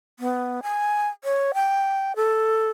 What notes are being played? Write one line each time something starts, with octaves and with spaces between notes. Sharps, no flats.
B3
G#5
C#5
G5
A4